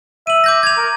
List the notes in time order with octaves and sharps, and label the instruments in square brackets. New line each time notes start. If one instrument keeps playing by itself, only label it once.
[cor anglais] E5 [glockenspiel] D#7 F#7
[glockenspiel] D6 G6 A#6
G#6 F7
[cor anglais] A#4